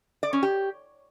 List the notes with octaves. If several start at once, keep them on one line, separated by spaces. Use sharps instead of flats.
D5
C#4
G4